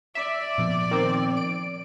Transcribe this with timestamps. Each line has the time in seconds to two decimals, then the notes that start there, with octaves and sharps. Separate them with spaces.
0.15 D5 E5
0.58 A#2 F3 B3
0.91 D#3 C4
1.37 D7